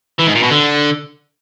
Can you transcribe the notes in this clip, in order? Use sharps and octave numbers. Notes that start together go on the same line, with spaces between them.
E3
G#2
A#2
B2
D3